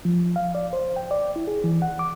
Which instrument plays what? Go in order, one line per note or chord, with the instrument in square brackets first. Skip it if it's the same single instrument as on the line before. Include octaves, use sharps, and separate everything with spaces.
[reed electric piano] F3
F5
D5
C5
G5
D5
E4
G#4
E3
F#5
D6